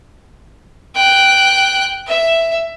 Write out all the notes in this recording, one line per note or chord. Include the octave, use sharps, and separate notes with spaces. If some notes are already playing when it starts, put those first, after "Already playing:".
G5 F#6
E5